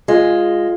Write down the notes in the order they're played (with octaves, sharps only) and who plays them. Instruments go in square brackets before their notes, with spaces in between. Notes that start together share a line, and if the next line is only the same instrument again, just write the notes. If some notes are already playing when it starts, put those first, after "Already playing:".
[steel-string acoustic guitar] G#3 [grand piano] F4